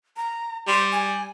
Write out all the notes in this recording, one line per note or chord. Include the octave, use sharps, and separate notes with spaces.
A#5
G3 C6
G#5